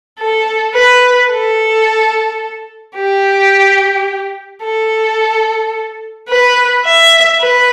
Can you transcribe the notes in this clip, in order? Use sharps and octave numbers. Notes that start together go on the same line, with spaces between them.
A4
B4
A4
G4
A4
B4
E5
B4